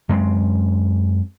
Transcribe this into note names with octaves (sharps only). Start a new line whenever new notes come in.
F#2 G#3 A#3 C4